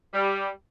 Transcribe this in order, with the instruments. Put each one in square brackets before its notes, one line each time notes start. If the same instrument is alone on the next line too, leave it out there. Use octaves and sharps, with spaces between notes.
[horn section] G3